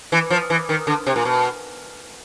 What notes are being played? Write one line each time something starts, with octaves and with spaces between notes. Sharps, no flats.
E3
F3
E3
D#3
D3
C3
A#2
B2